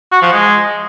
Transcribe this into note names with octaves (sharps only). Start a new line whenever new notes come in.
F#4
F3
G#3